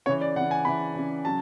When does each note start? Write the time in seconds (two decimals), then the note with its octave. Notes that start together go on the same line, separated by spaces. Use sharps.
0.06 C#3 C#5
0.09 E3
0.21 D5
0.36 E3 F#5
0.40 C#3
0.51 G#5
0.65 C#3 E3 B5
0.95 C#3 E3
1.25 C#3 F#3 A5